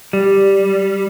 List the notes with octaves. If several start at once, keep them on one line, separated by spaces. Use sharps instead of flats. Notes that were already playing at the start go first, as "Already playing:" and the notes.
G3